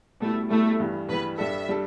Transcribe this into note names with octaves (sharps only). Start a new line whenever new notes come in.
B2 G3 A3 E4
B2 G3 A3 E4
G2 E3 G3
G2 E3 G3 B4
G2 G3 D4 A4 E5
G3 D4 A4